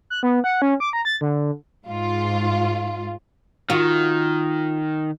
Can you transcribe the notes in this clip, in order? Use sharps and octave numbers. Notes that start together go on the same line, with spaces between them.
F#6
B3
F#5
C#4
D6
A#5
A6
D3
G#2 F4
D#3 F4 F#4